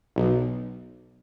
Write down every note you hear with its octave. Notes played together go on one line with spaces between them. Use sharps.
B1